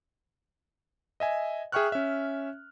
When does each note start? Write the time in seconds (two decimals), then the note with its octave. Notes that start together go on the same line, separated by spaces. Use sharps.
1.20 D#5 E5 G#5
1.72 G#4 E5 G5 C#6 F6 F#6
1.92 C#4 E5